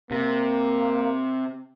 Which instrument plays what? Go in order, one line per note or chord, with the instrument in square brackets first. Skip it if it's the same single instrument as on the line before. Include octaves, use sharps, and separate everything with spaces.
[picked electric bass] C3 [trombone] A#3